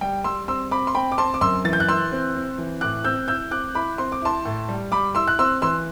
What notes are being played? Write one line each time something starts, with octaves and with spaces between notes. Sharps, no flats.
G3 G5
G3 C6 E6
C4 C6 E6
C4 B5 D6
C6
C4 G5 B5
D6
C4 A5 C6
D6
F#2 C6 E6
E3 A6
G6
F#6
E3 C6 E6
C4
C4
E3
A2 D6 F#6
C4 E6 G6
E4 E6 G6
C4 D6 F#6
E4 B5 D6
C4 C6
D6
E4 A5 C6
A2
G3
G3 B5 D6
E4 C6 E6
F#6
C4 C6 E6
E3 C6 E6